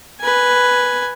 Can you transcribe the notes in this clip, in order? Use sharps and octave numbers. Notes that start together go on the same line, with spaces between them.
B4 G#5